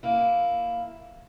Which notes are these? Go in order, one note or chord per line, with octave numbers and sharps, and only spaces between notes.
A#3 E4